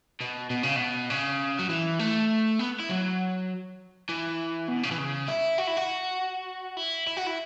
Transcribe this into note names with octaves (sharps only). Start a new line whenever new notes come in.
B2
B2
C#3
B2
C#3
F#3
E3
A3
B3
E4
F#3
E3
B2
C#3
E3
C#3
E4
F#4
E4
F#4
E4
E4
F#4
E4